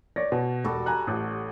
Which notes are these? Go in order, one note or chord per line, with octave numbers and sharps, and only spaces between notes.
C#5 D5 A#6
B2
E1 G3 F#4 A4
G#5 A#5 F#6
A1